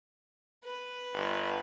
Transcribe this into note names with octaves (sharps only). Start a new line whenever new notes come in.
B4
G1